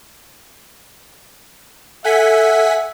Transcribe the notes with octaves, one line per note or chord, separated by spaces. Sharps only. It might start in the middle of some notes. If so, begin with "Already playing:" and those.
A4 E5 F#5 G#5 B6